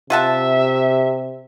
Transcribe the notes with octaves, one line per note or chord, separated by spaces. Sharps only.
C3 F4 E5 F#5 A5